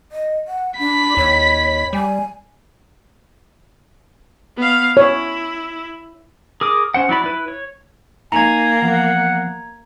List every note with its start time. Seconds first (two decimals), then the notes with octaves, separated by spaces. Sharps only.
0.12 D#5
0.48 F#5
0.79 D4 B5 B6
1.17 D#2 C#5
1.93 G3 G#5
4.57 B3 F5
4.97 E4 C#5
6.61 G#4 A#4 D6 D#6
6.94 C#4 C5 F#5
7.09 F#3 E4 D5 B5
7.24 E4 B4
7.48 C#5
8.32 A#3 D#4 G#5 A#5 G#6
8.82 E3 F3 B3 F#5